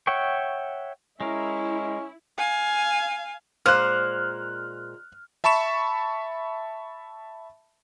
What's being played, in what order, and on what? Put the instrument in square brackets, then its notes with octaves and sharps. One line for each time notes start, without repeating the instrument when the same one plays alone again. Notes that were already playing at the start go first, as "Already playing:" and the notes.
[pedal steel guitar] C#5 E5 F#5 G5 C#6
[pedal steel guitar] G#3 A#4 [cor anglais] C#4 [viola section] E4
[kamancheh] F5 G#5
[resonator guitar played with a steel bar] A#2 G#3 C5 [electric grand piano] F6 F#6
[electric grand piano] E5 A5 B5 C#6 E7